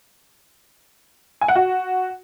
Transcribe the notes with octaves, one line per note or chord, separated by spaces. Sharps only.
G#5
F#5
F#4